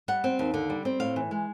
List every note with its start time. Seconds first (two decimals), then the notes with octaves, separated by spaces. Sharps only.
0.08 G3 F#5
0.24 C4
0.39 D#2
0.54 D3
0.70 G3
0.85 C4
1.00 A2 F5
1.16 E3
1.31 G#3